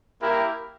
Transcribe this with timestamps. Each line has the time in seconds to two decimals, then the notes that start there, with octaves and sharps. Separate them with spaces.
0.22 A#3 E4 G4 A#4